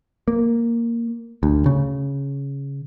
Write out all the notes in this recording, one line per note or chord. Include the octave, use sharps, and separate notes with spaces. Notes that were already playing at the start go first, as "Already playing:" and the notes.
A#3
D2
C#3